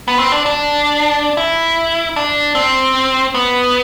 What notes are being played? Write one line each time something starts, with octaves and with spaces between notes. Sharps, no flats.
B3
C4
D4
D4
E4
D4
C4
B3